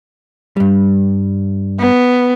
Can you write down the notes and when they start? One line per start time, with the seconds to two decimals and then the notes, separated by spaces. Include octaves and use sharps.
0.57 G2 G3
1.80 B3